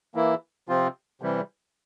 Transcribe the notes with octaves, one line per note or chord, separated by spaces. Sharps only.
E3 A#3 E4
C3 F3 C4 F4
C3 E3 G3